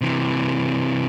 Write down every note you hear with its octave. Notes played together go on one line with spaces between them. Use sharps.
C3 E3